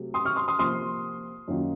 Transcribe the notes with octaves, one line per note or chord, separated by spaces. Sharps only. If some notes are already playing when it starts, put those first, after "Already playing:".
Already playing: C3 F#3 A3
C6 D#6
C#6 F6
C6 D#6
C6 D#6
C3 F3 A#3 C6 D#6
F#2 D#3 A#3 F4